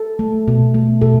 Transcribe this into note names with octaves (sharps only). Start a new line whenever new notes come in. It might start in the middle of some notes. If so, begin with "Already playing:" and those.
Already playing: A4
A3
B2
A3
B2 A4